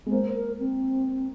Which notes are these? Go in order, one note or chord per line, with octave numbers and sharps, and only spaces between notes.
G#3
A#3 C5
A#4
C4